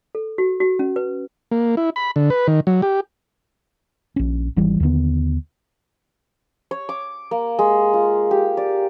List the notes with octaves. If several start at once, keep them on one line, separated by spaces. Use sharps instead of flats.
A4
F#4
F#4
C#4
B4
A#3
E4
B5
D3
B4
D#3
F#3
G4
A#1 C#4
G#1 E3 G3
D#2 D3 G#3 B3
C#5
D6
A#3
G#3
F4
G4
D5